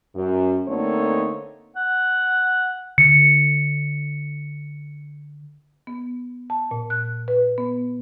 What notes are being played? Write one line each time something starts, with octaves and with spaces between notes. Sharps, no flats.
F#2
D3 A3 A#3 C4 D#4 C#5
F#5
D3 C#7
B3
A5
A#2
F#6
B4
B3